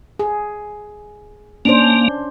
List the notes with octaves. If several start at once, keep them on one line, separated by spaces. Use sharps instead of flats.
G#4
A#3 C#4 D4 C5